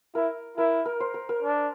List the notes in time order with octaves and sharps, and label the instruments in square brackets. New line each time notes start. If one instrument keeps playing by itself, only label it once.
[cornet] E4 [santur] A#4
[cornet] E4 [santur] A#4
[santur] A#4
C5
A#4
A#4
[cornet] D4